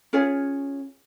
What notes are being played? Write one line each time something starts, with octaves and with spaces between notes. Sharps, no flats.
C#4 F4 G#4 C#5